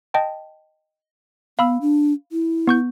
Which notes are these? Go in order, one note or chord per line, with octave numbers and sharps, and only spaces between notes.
D#5 G5 A5
B3 F5 B5 E6
D4
E4
B3 C#6 G6